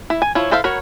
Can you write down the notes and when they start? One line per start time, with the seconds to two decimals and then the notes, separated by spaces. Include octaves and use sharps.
0.10 E4
0.22 G#5
0.35 F3 E4 C#5
0.51 E4 A4 C5 E5 F5
0.64 F#4 A#4 B4 C#5